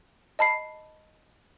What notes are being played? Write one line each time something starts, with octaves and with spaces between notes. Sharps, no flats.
D#5 A5 B5 C7